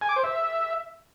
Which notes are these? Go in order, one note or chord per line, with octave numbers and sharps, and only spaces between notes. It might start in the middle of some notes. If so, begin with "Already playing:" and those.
G#5
D6
C5
E5